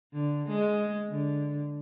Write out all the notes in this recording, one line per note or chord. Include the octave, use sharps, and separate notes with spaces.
D3
G#3
D3